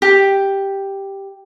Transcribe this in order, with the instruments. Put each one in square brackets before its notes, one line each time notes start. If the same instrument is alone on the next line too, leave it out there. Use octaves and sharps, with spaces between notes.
[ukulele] G4